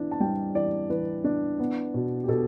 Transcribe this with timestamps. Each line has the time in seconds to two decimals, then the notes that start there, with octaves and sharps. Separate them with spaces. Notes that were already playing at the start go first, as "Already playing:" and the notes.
Already playing: E3 D4
0.11 A5
0.20 G3 G5
0.55 E3 D5
0.90 E3 B4
1.24 D4
1.59 B3
1.94 B2
2.24 G4
2.28 B2 A4